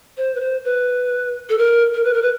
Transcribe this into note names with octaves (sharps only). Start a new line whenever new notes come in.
C5
B4
C5
B4
A4
A#4
A#4
B4
A#4
B4